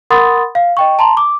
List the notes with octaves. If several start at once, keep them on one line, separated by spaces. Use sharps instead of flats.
A#4 F#5 B5 C6 D#6 A6
F5
D#5 G5 C#6
A5 A#5 C6
D6